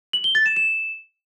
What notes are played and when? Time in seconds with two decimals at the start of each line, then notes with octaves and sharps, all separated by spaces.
0.13 F#7
0.24 G7
0.35 A6
0.46 E7
0.56 E7